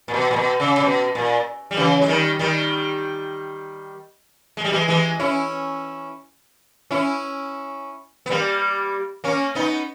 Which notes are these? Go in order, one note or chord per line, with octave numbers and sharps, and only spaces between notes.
A#2
B2
A#2
B2
C#3
C#3
B2
A#2
G3
C#3 E3
G#3
D#3 G3
D#3 G3
G#3
G3
E3 G#3
E3 G#3
C#4 E4
C#4 E4
B3
G3 A#3
A#3 C#4
B3 D#4